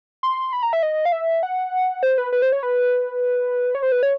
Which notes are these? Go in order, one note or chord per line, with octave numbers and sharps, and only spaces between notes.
C6
B5
A#5
E5
D#5
F5
E5
F#5
C5
B4
B4
C5
C#5
B4
C#5
C5
B4
C#5